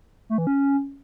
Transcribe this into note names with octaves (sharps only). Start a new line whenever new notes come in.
A3
E3
C#4